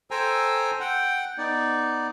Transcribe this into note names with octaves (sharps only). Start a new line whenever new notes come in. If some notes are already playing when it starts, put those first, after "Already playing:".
A4 C5 G5 G#5 A#5 E6
F#5 G5
B3 D#4 D5